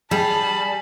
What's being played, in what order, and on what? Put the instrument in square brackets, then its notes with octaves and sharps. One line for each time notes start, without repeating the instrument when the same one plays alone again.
[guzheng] G3 [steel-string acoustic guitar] G#4 [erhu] A5 [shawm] B5